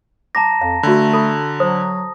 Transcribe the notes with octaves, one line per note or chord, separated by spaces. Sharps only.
A5 A#5 D6 A#6
F2 F5
D3 A3 F#4 B5
A4 B5
F#3 C5 D#6